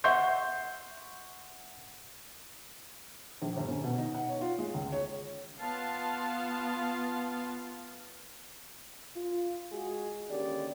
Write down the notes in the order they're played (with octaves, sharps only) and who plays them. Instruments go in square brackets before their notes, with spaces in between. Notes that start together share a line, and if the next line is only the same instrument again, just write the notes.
[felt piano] E5 F#5 C6 C#6 G6 C7
A#1
G1
C#4
B2
D#4
F#5
C#5
F4
G#3
C#2
C#5
[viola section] B3 F4 F5 A5
[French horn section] F4
G#3 F#4 G#4
D#2 D3 D#3 C#4 G4 D5